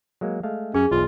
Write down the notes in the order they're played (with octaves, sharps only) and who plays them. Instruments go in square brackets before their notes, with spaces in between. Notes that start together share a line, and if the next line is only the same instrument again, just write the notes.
[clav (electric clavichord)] F#3 G#3 A#3
G#3 A3 F5
[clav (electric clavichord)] F#2 [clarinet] C#4 [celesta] G#4
[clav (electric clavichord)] B1 E2 [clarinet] F4